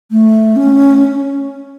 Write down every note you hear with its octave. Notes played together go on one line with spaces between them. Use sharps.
A3
C#4